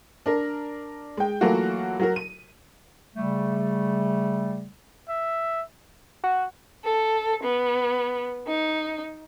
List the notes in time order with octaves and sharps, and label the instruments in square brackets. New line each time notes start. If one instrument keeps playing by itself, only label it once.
[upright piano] D4 A#4
G#3 G5
E3 F#3 A3 A#3 F4 F#4
F#3 F#4 A#4
D#7
[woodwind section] C#3 G3 A3
[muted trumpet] E5
[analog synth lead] F#4
[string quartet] A4
B3
D#4